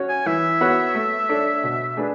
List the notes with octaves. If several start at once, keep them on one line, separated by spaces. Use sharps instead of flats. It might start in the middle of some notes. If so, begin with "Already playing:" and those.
Already playing: C#4 F#4 C#5
G#5
E3 E5
B3 F#4 C#5
A3
D4 A4 C#5
B2
A3 D4 G#4 B4